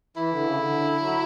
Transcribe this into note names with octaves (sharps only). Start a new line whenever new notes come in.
E3 E4
D3
C#3
D3
F#3